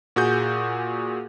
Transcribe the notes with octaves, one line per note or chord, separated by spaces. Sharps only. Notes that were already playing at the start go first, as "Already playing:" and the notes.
A#2 F#4 G#4 G6